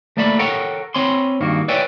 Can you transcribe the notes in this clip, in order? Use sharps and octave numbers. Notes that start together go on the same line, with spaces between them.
A3 A#3 D5 E5 A5 B5
A4 A#4 C#5 F#5 G5
C4 C#5 G#5 B5 C6
G2 D#3 A#3 F#4
B4 C#5 D5 E5 G5 G#5